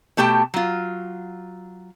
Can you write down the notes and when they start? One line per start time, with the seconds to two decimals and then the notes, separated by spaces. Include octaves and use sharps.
0.17 B2 A3 G4 G5 A5
0.54 F#3 F4